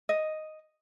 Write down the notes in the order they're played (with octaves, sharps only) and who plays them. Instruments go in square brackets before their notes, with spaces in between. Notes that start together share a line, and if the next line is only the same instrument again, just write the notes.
[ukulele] D#5